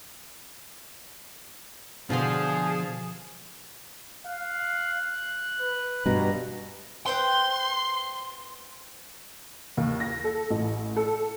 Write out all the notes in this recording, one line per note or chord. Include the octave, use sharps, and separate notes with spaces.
B2 D3 F3 F4 G#4 C5 C6
F5 F#6
B4
G2 B2 A#5
B4 C5 G5 C6
D#2
A#6
A4
A1
A4